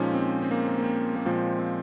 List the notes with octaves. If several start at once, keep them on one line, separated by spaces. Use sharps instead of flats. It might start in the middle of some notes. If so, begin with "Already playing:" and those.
Already playing: A#2 F3 G#3 C#4 D#4
C4
C4
A#3
A#3
A#3
C4
A#3
A#2 F3 G#3 C4
C4